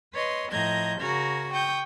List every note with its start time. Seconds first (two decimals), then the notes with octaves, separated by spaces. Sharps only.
0.13 B4 C#5 D#5 C6
0.51 A2 F3 D#5 A#5 G6 G#6
1.00 C#3 F#4 A#4 A#5 G#6
1.51 G5 C#6 D#6 G6